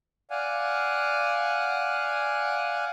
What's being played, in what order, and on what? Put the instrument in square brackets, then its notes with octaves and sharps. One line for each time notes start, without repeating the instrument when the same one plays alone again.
[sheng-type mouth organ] D5 F5 F#5 G#5